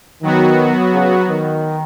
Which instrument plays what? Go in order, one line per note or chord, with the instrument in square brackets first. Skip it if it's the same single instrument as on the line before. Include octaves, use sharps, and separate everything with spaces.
[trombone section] D#3 [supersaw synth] F#3 B3 F#4
[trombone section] C#3
D#3